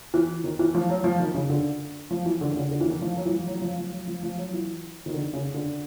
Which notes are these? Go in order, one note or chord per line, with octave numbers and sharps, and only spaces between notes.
E3
D#3
E3
F3
F#3
F3
D#3
C#3
D3
F3
E3
D3
D3
C#3
D3
E3
D#3
F3
F#3
E3
F3
F#3
F#3
F3
F3
F#3
F3
F3
F#3
E3
D#3
D3
C#3
D3